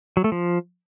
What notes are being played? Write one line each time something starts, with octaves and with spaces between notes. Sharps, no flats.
F#3
A3
F3